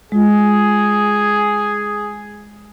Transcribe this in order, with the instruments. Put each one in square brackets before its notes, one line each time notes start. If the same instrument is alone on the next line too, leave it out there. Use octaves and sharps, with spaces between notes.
[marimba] G#3 F4 [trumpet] G#4